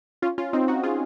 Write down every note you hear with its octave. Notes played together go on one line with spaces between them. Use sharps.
C#4 F4
C#4 F4
C4 D#4
D#4 F#4
F4 G#4